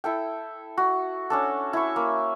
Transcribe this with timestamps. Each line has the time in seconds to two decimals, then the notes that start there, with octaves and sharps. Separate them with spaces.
0.04 E4 A4 G5
0.78 F#4
1.30 C#4 D4 A4
1.73 E4 C#6
1.96 A#3